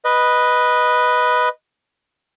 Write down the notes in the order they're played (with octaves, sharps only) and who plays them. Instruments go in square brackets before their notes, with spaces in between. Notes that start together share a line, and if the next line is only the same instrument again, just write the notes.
[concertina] B4 D#5